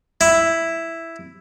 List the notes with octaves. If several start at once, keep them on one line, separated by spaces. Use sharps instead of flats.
E4